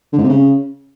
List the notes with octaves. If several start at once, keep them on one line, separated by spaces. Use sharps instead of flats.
D3
G#2
C3
C#3